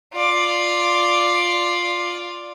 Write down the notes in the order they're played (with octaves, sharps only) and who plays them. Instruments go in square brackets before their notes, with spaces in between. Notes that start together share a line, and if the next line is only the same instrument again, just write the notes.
[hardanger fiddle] F4 D5